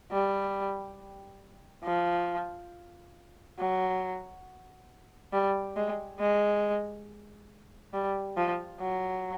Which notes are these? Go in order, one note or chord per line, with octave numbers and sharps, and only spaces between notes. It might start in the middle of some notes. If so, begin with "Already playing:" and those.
G3
F3
F#3
G3
G#3
G#3
G3
F3
F#3